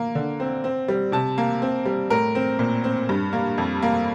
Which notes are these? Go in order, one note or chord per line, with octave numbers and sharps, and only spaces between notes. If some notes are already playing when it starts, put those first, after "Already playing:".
Already playing: A#3
D3
C4
C4
G3
C3 A5
A#3
C4
G3
A2 A#4
C4
A#2
C4
G2
A#3
F2
A#3